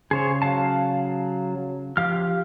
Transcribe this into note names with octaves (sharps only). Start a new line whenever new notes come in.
C#3 G#4 C5 C#5
F#3 F5 A5
F3 G4 F5 F6